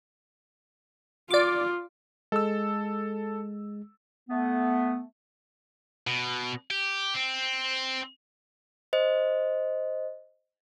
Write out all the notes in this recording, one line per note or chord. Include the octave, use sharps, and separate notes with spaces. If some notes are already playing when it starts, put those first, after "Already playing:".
F4 D5 D6
G#3 A4 E6
A3 B3
B2
G4
C4
C5 D#5